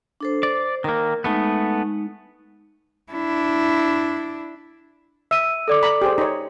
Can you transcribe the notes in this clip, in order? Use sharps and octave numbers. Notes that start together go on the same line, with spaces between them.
D4 A4 C5
C5 D5
D#3 A#3 A#4
G#3 A3 B3 D#4
D4 E4
E5 E6 D#7
A4 D5 D6
A#5 B5
G4 G#4 C5
D#4 C#5